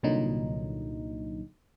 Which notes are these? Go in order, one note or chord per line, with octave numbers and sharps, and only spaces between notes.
C2 A#2 D3 F#3 D#4